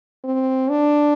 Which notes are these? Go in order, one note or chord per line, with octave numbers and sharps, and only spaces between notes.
C4
D4